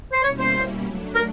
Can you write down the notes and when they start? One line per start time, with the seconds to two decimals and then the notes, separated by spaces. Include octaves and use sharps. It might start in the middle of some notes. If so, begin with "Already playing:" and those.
0.11 C5
0.23 B2 G3 A#3 C#4 E4 C#5
0.38 C5
0.83 F#3 A3 D4
1.14 A#4